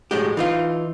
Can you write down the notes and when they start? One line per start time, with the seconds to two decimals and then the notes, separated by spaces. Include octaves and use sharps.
0.11 A2 F#3 G#3 G4
0.37 E3 D#4 F4